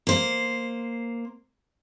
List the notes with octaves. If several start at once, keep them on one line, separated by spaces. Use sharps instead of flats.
A#3 C5